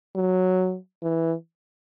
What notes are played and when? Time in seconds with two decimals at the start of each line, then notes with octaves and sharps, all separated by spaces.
0.16 F#3
1.03 E3